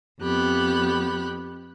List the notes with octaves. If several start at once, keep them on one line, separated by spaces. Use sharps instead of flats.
F2 B3 G4 B5 F#6